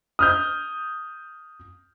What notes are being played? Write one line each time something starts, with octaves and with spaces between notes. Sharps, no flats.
D#6 F6 G6